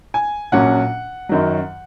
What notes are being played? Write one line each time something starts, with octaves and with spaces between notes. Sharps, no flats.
G#5
A#1 A#2 F#3 C#4 F#5
F#2 D#3 F#3